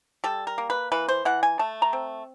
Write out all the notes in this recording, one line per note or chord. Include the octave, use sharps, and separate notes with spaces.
G3 A4
A#4
A#3
B4
E3 B4
C5
E3 F#5
G#5
A3 A5
A#5
C4